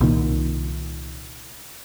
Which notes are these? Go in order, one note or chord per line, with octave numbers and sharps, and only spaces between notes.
C2 A#2 D#3